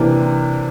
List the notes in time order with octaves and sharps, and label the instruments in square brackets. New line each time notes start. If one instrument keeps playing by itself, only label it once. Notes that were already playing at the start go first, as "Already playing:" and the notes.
Already playing: [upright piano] C3 E3 A#3 D4